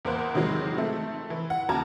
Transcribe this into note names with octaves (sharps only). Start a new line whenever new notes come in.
E2 A#3 C5 F#6
C3 D#3 E3 F#3 G#3
A3 C4
E3
F#5
D#2 C#3 F#4 A5 A#5 G#6